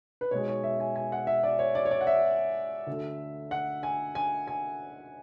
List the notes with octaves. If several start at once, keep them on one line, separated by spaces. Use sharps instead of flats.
B4
B1 B2 G#3 C#5
C#5
E5
G#5
G#5
F#5
E5
D5
C#5
D5
C#5
D5
F#5
E5
D2 D3 A3
F#5
G#5
G#5
G#5